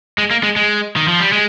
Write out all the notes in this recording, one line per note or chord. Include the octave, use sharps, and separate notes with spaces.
G#3
A#3
G#3
G#3
D#3
F3
G3
G#3